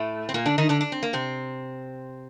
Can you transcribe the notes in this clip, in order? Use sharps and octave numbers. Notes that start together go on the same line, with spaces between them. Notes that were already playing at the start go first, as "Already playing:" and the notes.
Already playing: A2 A3
C4
A#2 A#3
D3 D4
D#3 D#4
D3 D4
D4
C4
A#3
C3 C4